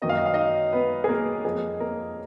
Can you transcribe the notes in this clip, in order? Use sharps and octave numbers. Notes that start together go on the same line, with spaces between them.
F#2 D#3 F#3 A#3 D#4 D#5
F5
D#5
F5
D#4 D#5
B3 B4
G#4
A#3 A#4
F2 F3 A#3 D#4 G#4
A#3 A#4